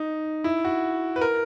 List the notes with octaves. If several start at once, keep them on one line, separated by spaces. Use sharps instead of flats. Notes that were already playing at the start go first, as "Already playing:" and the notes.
Already playing: D#4
E4
F#4
B4
A#4